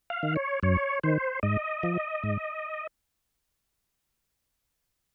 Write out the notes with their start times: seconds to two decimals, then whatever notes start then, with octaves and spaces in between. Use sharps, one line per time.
0.10 F5
0.23 D#3
0.36 C#5
0.63 F#2 C#5
1.03 D#3 C5
1.43 G#2 D#5
1.83 F3
2.23 G#2